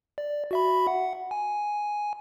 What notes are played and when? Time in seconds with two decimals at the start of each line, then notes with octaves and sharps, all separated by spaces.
0.18 D5
0.51 F#4 E5 B5
0.87 F#5
1.31 G#5